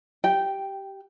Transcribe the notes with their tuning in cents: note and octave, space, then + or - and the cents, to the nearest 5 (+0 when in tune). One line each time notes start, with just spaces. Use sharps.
G4 -15 G5 +0